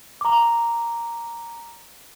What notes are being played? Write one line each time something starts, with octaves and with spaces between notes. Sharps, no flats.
A#5 D6